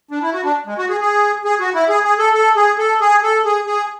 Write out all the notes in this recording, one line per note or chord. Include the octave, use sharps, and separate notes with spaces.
D4
E4
F#4
D4
G#3
F#4
G#4
G#4
G#4
F#4
E4
G#4
G#4
A4
A4
G#4
A4
G#4
A4
G#4
G#4